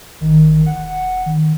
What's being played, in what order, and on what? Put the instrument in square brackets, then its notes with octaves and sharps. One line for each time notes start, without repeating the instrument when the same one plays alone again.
[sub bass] A1 [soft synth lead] D#3
[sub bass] E1 [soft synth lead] F#5
[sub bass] D#3